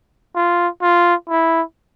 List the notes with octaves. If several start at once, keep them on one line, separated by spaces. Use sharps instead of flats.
F4
F4
E4